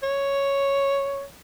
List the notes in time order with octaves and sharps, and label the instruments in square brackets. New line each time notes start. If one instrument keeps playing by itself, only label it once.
[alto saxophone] C#5